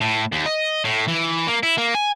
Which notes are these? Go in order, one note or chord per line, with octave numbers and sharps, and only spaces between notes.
A2
D#2
D#5
A2
E3
A#3
E4
A#3
G#5